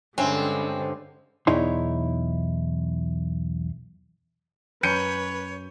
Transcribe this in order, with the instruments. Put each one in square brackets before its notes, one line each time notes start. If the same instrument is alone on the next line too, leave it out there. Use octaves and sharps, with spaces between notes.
[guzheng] G2 [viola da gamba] D3 G#3 [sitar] C4 [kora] C#4
[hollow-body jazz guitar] B1 E2 D#4 E4 C#5 C6
[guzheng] F#2 [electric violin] B4 [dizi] C#5 [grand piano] G6 C#7 D#7